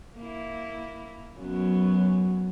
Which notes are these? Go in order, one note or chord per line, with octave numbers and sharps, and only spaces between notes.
A#3 E4
F#2 F#3 B3